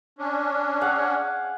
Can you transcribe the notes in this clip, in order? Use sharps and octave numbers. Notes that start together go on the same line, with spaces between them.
C#4 D4
G#4 F5 F#5